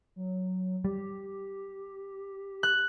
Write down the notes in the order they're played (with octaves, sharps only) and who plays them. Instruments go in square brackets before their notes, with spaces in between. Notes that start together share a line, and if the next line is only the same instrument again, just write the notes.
[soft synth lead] F#3
[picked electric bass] G3 [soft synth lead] G4
[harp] F#6